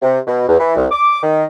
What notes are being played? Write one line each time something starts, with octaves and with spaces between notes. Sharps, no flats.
C3
B2
E2
E3
C2
D6
D#3